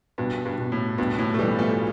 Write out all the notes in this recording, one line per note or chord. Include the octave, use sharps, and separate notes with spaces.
G2 B2
G2
B2
A2
G2 B2
A2
A3
B1 E3 G3
F3 A3